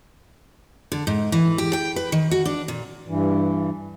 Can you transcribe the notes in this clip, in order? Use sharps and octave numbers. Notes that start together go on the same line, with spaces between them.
D3
G#2
E3
G4
G5
B4
D#3
F#4
D4
A#2
G2 E3